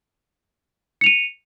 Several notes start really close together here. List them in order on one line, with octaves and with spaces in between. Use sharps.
C#7 F7 D#7